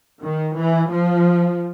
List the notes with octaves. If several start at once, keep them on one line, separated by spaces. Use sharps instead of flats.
D#3
E3
F3